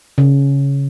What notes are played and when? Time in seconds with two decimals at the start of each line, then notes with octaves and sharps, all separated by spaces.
0.18 C#3